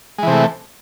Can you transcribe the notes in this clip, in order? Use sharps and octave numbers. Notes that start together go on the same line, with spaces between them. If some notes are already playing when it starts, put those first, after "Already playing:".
C3 E3 G#3 A3